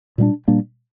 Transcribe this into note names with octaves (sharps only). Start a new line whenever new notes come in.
A#2 G3 A#3 D4
A#2 G3 A#3 D4